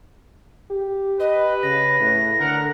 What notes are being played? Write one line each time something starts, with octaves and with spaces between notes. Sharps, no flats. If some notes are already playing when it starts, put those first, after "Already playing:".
G4
B4 D#5
C#3 A#6
A2
D3 A#4 F#5